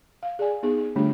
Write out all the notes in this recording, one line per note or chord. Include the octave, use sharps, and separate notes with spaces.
F5
G#4 D5 G#5
B3 D#4 G#4
G#4
D3 G3 A3 D4 F4 G4